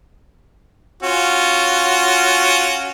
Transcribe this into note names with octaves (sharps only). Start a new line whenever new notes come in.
C#4 F4 F#4